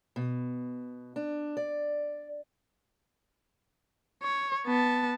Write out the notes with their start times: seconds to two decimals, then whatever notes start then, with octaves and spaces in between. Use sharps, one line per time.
0.16 B2
1.16 D4
1.57 D5
4.22 C#5
4.67 B3 A5